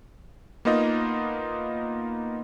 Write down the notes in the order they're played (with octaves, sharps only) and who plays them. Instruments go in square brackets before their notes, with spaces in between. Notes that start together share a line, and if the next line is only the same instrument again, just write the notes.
[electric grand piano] A#3 B3 D#4 F4 D#5